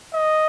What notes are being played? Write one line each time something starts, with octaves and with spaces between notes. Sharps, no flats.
D#5